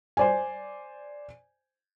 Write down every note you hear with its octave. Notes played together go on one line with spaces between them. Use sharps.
C5 D5 G#5